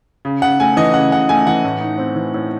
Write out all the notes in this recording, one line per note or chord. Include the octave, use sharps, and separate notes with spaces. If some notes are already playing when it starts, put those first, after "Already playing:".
C#3
C#3 F#5
A3 G#5
E3 D#5
C#3 F#5
C#3 F#5
A3 G#5
E3 F#5
A2
D#4
C4
E3
A2